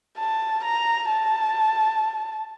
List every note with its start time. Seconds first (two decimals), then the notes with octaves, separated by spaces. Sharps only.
0.18 A5
0.64 A#5
1.09 A5